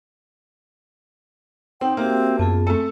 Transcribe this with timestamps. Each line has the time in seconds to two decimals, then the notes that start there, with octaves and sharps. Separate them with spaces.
1.81 C4 D#4 F#5 G5 C6
1.97 A#3 C4 F#4 G4 E5
2.39 F#2 B3 F4 G#4 A5
2.67 A3 C4 A4